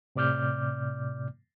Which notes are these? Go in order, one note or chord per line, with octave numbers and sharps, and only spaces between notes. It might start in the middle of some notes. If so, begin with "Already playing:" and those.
A2 C3 D5 D6 F6 G6